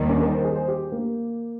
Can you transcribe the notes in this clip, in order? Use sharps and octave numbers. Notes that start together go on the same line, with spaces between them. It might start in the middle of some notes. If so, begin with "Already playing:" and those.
Already playing: D#2 D#3 G3
C#4
A#4
C5
G#4
C5
G4
A#3